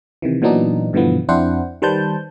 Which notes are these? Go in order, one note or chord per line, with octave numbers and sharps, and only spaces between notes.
C3 D#3 E3
A#2 E3 F#3 B3 D4 D#4
G2 B2 D3 E3 F3 B3
F2 C4 D4 E4 C5 F#5
D#3 G3 B4 C5 A5 G6